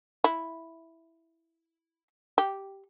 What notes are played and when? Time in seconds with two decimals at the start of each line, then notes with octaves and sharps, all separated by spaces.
0.24 E4
2.38 G4